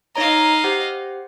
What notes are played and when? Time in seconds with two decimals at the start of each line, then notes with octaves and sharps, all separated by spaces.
0.16 D#4 C#5 D#5 F5 A#5
0.64 G4 C5 F#5